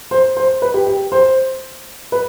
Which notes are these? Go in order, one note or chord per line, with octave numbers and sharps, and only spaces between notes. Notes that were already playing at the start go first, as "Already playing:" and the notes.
C5
C5
B4
G4
G4
C5
B4